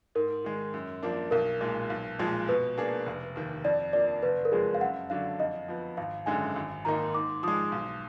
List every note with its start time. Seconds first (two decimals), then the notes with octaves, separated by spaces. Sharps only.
0.15 G#2 A#4
0.44 D#3 G#3
0.74 F#2
1.03 F3 A#3 D4
1.31 B1 A#4
1.61 A#2 G#3
1.90 B1
2.19 A#2 F3 G#3
2.48 B2 B4
2.77 A#3 D4 G#4
3.06 F1
3.36 D#2 D#3
3.64 F2 D5
3.93 F3 A#3 D4 D5
4.23 F#1 B4
4.45 A#4
4.52 F2 F3 G#3 G#4
4.74 F5
4.81 F#2 F#5
5.10 D3 F#3 D4 F5
5.39 F2 D#5
5.68 F3 B3
5.97 G#1 F5
6.26 F#2 D3 G#3 D#4 G#5
6.56 G#1
6.85 G#2 D#3 A#3 D#4 A#5
7.15 G#2 D6
7.43 F3 G#3 D#6
7.72 B1